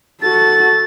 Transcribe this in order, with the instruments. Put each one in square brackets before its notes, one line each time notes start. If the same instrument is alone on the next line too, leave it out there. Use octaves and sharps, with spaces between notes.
[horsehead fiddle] F#4 A4 [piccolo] A6